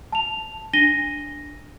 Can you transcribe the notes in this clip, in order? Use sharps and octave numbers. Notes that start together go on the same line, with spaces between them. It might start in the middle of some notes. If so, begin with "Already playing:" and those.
A5 F7
D4 A#6 D#7 G7